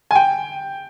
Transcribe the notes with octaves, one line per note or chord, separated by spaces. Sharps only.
G#5
G5